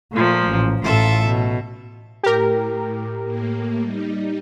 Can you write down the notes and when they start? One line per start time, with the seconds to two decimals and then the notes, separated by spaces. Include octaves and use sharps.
0.13 A#2 F3 A3
0.48 A1
0.83 A1 A2 F4 A4 E5
1.27 B2
2.24 A2 G4 A#4
3.24 A2 A#3
3.81 G3 D#4